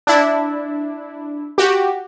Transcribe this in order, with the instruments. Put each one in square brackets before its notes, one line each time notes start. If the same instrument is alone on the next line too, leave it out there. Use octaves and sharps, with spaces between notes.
[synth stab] D4 E4
F#4 G4